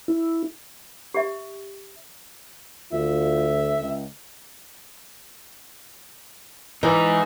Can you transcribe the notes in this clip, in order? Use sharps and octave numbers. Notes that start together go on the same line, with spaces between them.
E4
G4 E5
D2 F4 E5
C#2
E3 D#4 G#4